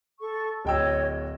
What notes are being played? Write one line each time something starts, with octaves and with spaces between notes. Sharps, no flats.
A4 C#6
D1 C#5 D#5 G5 E6